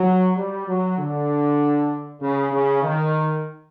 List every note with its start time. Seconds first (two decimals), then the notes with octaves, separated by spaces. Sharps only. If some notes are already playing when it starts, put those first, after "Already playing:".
Already playing: F#3
0.37 G3
0.68 F#3
0.98 D3
2.21 C#3
2.52 C#3
2.82 D#3